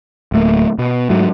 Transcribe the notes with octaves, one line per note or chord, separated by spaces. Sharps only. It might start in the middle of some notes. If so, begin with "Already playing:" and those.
D1 A3 A#3
B2
G#2 F#3 A3